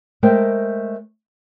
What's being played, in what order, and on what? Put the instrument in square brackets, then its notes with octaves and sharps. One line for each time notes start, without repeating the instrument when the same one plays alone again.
[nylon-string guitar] G#3 A3 A#4 C5 G5